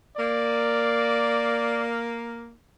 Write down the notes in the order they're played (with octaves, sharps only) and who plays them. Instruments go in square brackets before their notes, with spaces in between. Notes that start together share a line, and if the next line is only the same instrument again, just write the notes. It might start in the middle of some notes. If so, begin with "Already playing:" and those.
[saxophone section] A#3 [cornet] D5